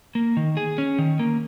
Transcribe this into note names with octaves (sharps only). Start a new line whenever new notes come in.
A#3
D#3
G#4
C#4
D#3
A#3